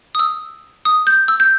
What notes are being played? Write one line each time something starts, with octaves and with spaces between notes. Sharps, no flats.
D#6
E6
D#6
G6
E6
G6